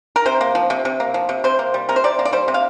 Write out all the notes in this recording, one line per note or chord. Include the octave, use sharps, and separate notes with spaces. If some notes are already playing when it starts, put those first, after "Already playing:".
A#4
C3 C5
A#3
F3
C3
C3
A#3
F3
C3
C3 C5
A#3
G3
C3 A#4
C5
C3 D5
A#3
D5
G3 C5
C3
F5